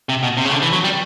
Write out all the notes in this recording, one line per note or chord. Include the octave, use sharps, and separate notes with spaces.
C3
B2
C3
C#3
D3
E3
F#3
G3